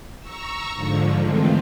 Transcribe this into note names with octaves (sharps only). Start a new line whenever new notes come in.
A#5 C#6 E6
G#2 D3 F3
D#3 E3 G#3 A3 C4 F4